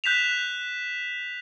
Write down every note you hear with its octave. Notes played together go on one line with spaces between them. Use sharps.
F#6 G6 B6 E7 F7